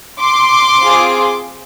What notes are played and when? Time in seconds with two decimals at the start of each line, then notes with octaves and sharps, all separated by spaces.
0.20 C6 D6
0.80 C4 F4 G#4